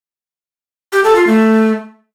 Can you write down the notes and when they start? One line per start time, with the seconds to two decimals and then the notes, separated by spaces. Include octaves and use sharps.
0.93 G4
1.04 A4
1.16 F4
1.27 A3